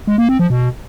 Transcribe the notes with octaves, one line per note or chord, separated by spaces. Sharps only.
G#3
A#3
C4
F3
B2